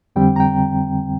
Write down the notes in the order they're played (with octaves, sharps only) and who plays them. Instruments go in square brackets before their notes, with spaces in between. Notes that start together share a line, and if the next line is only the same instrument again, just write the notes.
[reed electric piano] F2 D3 G3 C4 G5
A#5
G5